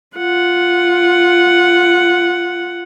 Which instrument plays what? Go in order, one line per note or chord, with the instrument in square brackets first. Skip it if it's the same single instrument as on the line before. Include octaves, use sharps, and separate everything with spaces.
[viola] F4 F#5